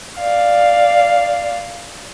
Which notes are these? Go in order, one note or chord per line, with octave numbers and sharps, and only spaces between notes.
D5 F5